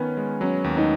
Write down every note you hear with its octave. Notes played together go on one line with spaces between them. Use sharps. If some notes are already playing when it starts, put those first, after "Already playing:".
Already playing: D#3 B3 C#4
G#3
F#3 C#4
D#2
D#4